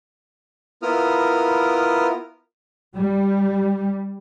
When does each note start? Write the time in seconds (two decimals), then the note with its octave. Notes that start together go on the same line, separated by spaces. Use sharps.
0.82 B3 E4 F4 A#4 D#6 F6
2.93 G3